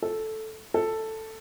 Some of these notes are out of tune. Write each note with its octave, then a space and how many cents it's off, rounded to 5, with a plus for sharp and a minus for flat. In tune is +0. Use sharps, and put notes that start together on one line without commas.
A4 -5
A4 +5